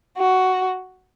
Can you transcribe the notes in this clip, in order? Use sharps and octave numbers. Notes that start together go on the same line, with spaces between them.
F#4